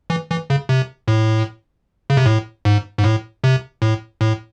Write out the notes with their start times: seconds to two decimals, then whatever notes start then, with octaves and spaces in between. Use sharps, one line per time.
0.10 E3
0.30 E3
0.50 C#3
0.69 C3
1.08 A2
2.10 C#3
2.17 C3
2.26 A2
2.65 G#2
2.98 G#2
3.04 A2
3.44 C3
3.82 A2
4.21 A2